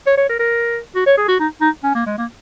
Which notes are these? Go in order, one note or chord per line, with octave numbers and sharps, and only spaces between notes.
C#5
C#5
A#4
A#4
F#4
C#5
G#4
F#4
D#4
D#4
C#4
A#3
G#3
A#3